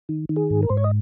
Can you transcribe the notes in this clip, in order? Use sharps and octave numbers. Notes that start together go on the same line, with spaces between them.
D#3
D#3
G#4
G#2
A#4
G#2 C5
C#5
D#5